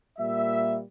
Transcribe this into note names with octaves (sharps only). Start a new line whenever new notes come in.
A#2 G3 A#3 E5